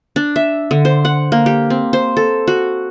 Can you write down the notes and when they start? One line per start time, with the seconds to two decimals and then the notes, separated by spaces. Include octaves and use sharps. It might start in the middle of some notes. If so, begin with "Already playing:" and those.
0.16 D4
0.36 E5
0.71 D3
0.85 C5
1.05 F#5
1.32 A#3
1.46 G4
1.70 C4
1.93 C5
2.17 A4
2.47 F#4